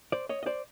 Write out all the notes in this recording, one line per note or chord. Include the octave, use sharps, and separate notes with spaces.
C5 D5
C#5 D#5
D#5
C5 D5